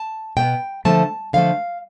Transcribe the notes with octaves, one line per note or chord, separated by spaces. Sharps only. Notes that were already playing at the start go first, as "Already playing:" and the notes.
Already playing: A5
B2 B3 G5
D3 F3 A3 A5
D3 F3 A3 F5